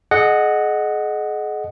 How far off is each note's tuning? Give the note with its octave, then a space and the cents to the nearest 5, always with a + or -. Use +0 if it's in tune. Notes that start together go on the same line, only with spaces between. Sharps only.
G#4 +35 D#5 -15 F#5 +0